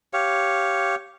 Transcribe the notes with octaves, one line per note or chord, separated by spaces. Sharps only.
G4 C#5 F5